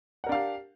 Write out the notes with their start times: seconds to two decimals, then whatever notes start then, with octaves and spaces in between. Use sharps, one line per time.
0.24 F#5
0.27 A#4
0.29 D4
0.32 F5
0.35 G4